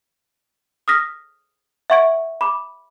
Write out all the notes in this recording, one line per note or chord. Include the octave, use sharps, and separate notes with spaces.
D#6 F6 A#6 B6
E5 F#5 C#6 G#6 D7
B5 D6